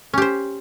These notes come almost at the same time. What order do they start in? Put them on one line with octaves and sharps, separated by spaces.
C#4 G4 C5